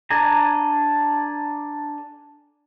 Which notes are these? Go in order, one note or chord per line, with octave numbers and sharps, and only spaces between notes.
D4 A4 D5 G#5 A#5